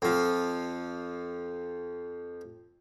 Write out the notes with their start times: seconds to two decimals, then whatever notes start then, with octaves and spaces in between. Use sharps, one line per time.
0.02 F2 F3